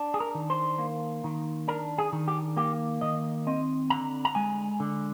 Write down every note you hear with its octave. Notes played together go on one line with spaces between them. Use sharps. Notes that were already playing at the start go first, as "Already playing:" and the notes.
Already playing: D4
G#4
A#4
D#3
C5
A#3
D#3
D4 A#4
G#4
D#3
G4
A#3 G4
D#3 D#5
C4 D#5
D3 A#5
A#5
G#3 G#5
D3